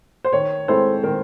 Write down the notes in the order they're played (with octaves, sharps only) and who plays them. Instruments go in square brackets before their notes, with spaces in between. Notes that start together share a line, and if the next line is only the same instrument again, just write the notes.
[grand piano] C5
[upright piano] D#3 [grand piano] C#5
[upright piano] G#3 C4 E4 A4 [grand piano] C5
[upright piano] D#3 [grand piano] A#4